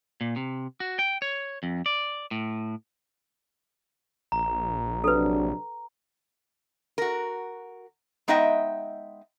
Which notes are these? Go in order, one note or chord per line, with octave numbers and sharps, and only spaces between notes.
A#2
C3
F#4
G5
C#5
F2
D5
A2
A#1 A#5
C3 F#3 D4 A4 B4
F#4 A#4
G#3 B3 D#4 D#5 E5 G5